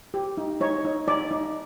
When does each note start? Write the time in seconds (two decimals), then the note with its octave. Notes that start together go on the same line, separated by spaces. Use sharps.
0.14 G4
0.37 D#4
0.61 D#4 C#5
0.85 D#4
1.07 D#4 D5
1.31 D#4